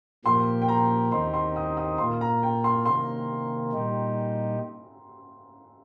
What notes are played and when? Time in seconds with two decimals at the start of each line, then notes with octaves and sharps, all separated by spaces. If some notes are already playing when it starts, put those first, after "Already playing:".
0.25 A#2 F3 A#3 G4 C6
0.62 G5
0.68 A#5
1.12 D#2 D#3 C4 D#4 G4 C6
1.34 C6
1.56 D#6
1.77 D#6
1.98 A#2 A#3 F4 C6
2.21 A#5
2.43 G5
2.64 C6
2.85 C3 D#3 A#3 C6
3.72 A#2 G3 D#4 G4